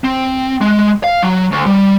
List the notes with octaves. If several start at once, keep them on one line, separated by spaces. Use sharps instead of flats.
C4
G#3
F5
F#3
D2
G3